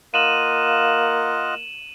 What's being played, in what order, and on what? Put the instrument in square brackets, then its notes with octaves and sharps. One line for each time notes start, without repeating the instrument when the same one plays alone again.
[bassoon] A#3 [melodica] F4 D#5 F#5 [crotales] D#7 E7 F#7